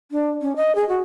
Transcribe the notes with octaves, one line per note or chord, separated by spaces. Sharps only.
D4
C#4
D#5
G#4
F#4